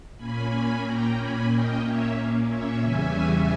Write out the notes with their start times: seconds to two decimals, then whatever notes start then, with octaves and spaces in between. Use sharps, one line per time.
0.17 A#2 A#3 C#4 G#5 B5
0.50 G#5 B5
0.84 G5 A#5
1.16 G#5 B5
1.48 D#5 G5
1.82 C#5 E5
2.47 C#5 E5
2.81 E2 C#3 E3 G3 C#4 E5 G#5